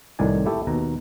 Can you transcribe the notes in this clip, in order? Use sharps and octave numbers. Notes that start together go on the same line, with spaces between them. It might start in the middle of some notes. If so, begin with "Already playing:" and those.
C2 A2 D#3 D5 G#5
A3 E4 G4 A4
D#2 B2 A#5